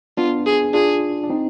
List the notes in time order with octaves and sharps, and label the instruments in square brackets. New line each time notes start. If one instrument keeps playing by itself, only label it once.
[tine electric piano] B3 D4 [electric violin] F4
[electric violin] G#4
[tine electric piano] D4 F4 [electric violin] G#4
[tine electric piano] D4
C4 D#4